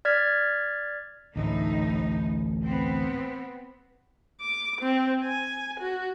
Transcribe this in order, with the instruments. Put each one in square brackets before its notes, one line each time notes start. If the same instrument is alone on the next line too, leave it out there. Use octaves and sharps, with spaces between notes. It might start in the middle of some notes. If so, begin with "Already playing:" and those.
[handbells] D5 F6 G#6 B6
[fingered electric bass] A1 D2 [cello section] A2 D#4
[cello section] B3 C4
[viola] D6
C4
G#5
F#4